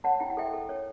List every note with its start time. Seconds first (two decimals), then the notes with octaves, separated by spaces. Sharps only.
0.04 C#5 F#5 A5
0.20 E4 G5
0.30 F#5
0.37 A4 E5 G5
0.53 A4
0.69 C#5